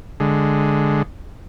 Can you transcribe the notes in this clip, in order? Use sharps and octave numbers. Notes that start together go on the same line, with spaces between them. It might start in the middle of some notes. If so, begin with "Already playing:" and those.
D3 G#3